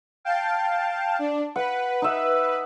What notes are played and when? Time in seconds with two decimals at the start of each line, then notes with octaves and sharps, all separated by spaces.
0.25 F5 G5 A5
1.19 D4
1.56 B4 F#5
2.02 D#4 E5